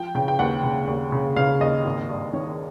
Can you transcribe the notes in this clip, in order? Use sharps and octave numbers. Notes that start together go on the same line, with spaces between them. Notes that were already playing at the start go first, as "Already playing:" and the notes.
Already playing: F3 G5
C#3 G5
G5
D#2 F#5
C#3
D#2
C#3
C#3 F5
D#2 D#5
G#1
G2
D#3 C#5